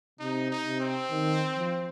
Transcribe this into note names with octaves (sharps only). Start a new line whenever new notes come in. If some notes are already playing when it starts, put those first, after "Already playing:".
C3 D#4
D#4
C3
C4
D#3
F3